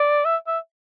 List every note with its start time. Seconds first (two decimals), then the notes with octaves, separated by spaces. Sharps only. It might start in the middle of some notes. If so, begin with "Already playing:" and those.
Already playing: D5
0.25 E5
0.47 E5